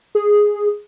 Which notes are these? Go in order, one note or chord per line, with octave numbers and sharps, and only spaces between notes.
G#4